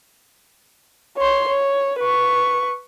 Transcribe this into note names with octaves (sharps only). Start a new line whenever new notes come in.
C#5 C6
C#5
B4 C#6